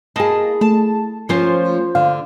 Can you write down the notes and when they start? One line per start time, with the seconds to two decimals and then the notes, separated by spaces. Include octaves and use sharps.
0.16 A#3 E4 G#4 D#5 A5
0.61 A3 A5
1.29 F3 A#3 C#4 F4 C5
1.95 D3 F5